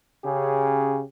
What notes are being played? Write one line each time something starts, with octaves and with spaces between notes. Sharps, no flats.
C#3 C#4 G4 G#4